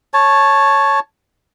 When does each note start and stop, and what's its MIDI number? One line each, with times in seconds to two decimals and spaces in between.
0.14 1.00 73
0.14 1.00 81